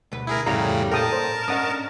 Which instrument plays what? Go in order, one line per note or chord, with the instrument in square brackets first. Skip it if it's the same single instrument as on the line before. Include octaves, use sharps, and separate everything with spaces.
[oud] D2 B2 B4
[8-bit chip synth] E4 G#4 A#4
[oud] F2 F5 [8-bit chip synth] A2 C#3 G3 [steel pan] A#5
[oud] A#2 [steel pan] A4 G5 D#6 [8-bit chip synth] A#4 A5
[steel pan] C5
[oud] C#4 D4 [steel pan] D#5 F#5 D#6